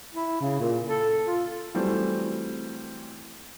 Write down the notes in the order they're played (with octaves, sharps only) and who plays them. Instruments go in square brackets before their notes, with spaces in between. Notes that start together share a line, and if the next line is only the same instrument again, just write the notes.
[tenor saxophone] E4
C#3
A#2
A4
F4
[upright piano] E3 F#3 G3 A3 C4